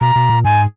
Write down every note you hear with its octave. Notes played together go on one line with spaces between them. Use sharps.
B2 A#5
B2
A#2
G#2 G#5